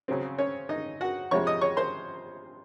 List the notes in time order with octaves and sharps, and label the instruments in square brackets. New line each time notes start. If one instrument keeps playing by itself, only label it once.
[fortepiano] C#3 F#3 C4
C#4 C#5
D#4 D#5
F#4 F#5
F2 C3 F3 G#3 C#5 C#6
D#5 D#6
C#5 C#6
C5 C6